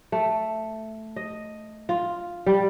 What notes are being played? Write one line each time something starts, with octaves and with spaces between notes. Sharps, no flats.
A3
D#5
F4
G3